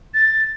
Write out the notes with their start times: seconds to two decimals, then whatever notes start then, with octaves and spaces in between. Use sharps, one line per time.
0.13 A6